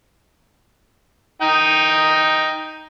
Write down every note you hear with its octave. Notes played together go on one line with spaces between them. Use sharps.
D#4 G5